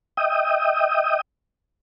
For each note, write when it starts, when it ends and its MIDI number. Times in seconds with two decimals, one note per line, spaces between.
0.17 1.21 75
0.17 1.21 76
0.17 1.21 79
0.17 1.21 87